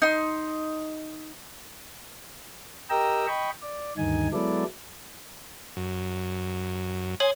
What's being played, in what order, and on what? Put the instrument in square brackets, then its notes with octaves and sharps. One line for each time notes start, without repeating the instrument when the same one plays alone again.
[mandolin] D#4 C6
[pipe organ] G4 A#4 D#5 G5 A#5 E6
D#5 G5 B5 C#6
D5
D2 G2 D#3 D#4 G#5
F#3 G#3 B3 E4 A4 D5
[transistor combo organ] F#2
[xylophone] C#5 F#7 [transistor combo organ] G#5 C6 D#6